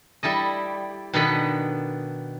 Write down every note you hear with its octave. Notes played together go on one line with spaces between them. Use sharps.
G3 E4 A4 D#5
B2 D#3 D4 A4 D#5 B5